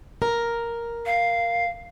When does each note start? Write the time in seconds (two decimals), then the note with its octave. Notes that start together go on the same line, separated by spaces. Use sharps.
0.22 A#4
1.06 F5